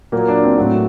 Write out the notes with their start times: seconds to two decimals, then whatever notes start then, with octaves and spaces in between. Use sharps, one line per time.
0.12 A#2 F#3 A#3
0.28 D4
0.43 C4
0.57 A2 F#3 C4